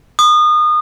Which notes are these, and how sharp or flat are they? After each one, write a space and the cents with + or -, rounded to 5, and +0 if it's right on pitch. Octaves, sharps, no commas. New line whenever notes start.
D#6 -30